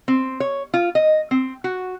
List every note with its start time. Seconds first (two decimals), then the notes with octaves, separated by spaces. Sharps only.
0.08 C4
0.40 C#5
0.74 F4
0.95 D#5
1.31 C4
1.64 F#4